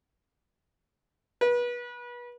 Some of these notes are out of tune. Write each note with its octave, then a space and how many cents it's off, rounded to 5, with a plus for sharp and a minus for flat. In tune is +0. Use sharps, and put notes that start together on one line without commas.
B4 -30